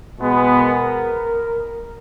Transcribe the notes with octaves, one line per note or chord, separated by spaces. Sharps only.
B2 G#3 B3
A#4